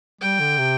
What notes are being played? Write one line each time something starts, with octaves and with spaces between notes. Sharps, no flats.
G3 G5
D3
C3